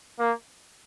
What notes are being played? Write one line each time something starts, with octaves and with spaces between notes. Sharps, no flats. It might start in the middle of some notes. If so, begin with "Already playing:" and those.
A#3